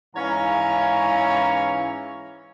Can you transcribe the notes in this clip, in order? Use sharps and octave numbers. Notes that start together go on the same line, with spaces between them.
G#2 E3 C#4 C#5 F5 A#5